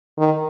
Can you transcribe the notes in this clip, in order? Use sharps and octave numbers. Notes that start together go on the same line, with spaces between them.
D#3